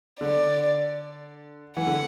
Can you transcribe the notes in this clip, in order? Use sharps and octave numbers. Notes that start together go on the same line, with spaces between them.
D3 D5
E3 F#5
D3